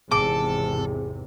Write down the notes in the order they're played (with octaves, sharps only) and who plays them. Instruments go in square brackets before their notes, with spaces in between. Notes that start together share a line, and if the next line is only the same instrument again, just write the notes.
[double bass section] G#1 E2 C3 [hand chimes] G#4 [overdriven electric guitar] A4 [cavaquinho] D6